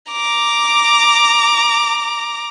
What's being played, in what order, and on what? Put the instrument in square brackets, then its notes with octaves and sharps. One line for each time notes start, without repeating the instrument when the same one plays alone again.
[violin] A#5 D6